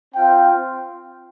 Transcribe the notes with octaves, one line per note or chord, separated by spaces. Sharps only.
C4 F4 G5